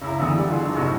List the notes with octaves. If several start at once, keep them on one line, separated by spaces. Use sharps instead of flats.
C#2 E4 A#5
D2 E3 B3 F#5 D#6
G3 D5
F4 G#4
F#3 D4 D#4
C2 A2 C3 F#4 D#5 E6